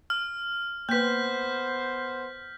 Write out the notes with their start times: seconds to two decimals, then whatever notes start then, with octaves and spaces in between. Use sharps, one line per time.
0.10 F6
0.89 A#3 B3 B4 C5 G6 B6